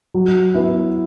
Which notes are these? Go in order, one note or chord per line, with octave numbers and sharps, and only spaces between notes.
F#3
B3 E4